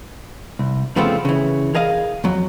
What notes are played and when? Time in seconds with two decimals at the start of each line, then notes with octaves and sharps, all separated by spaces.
0.59 C2
0.96 F2 C#3 A3 B3 C4 F4
1.25 C#3 E3
1.75 G#4 A#4 D#5 F5
2.24 F2 F#3